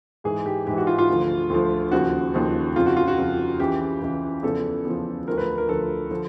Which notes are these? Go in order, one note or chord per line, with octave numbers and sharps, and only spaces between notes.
G#2 E3 G#4
G4
G#2 E3 G4
F#4
F4
F4
D2 D3 F3
D2 D3 F3
D#2 C#3 F3 F#4
D#2 C#3 F3
F2 C#3 F3 F4
F#4
F4
F#4
F2 C#3 F3
C#2 C#3 E3 G4
C#2 C#3 E3
E2 C#3 F3 A4
E2 C#3 F3
D2 D3 F3 A#4
B4
A#4
D2 D3 F3 A4
D3 F3